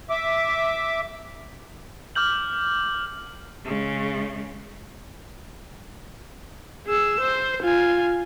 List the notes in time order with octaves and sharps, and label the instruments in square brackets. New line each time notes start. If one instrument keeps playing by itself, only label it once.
[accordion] E5 D6
[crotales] D6 F6 G6 F#7
[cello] C#3 G#3
[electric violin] G#4 E6
C5
F4 G#5